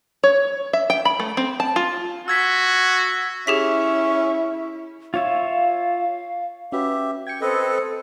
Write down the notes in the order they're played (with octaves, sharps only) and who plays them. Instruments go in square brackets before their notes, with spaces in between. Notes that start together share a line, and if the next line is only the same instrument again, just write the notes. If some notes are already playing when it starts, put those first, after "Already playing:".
[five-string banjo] C#5
E5
G5
B5
A3
C4
A5
F4
[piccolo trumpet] F#4 [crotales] E6 G#6 B6
[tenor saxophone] C#4 [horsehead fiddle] E4 [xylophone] G4 G#4 B6 [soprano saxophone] E5
[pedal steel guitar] F4 C#5 E5 [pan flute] F5
[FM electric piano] C#4 F#4 B4 [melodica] G4 E5
[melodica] G5 [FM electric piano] G#6 C#7
[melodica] C4 B4 D#5 [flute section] A4 C5